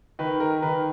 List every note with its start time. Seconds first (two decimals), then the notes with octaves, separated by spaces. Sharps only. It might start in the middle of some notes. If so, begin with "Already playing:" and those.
0.19 D#3 B4
0.40 A#4
0.62 D#3 B4